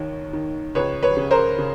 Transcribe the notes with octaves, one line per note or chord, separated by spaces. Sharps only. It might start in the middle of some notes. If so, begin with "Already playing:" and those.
Already playing: D#2 D#3 C#5
D#3
C#2 B4 C#5
B4 C#5
C#3
A#4 C5
C#3